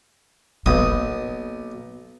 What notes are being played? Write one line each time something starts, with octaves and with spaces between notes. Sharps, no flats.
B1 A#3 B3 D#6